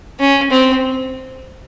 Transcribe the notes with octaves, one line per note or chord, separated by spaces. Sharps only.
C#4
C4